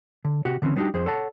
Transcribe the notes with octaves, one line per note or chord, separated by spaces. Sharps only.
D3
C3 F#4 G4 F#5
D3 E3 C4 C#4
G3 B3 D4 D#4 F#4 G4
F2 G#4 C5
A4 C#5 F#5 A5